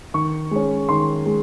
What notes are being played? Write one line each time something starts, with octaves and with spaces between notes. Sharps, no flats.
D#3 C#6
G#3 C#4
D#3 C6
G#3